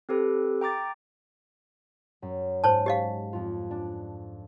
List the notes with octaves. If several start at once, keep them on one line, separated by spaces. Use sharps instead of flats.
C4 G4 A4 B4
G5 A#5 D6 A6
F#2
G#2 C5 C#5 A5
G4 D#5 F5
F2 F4
D4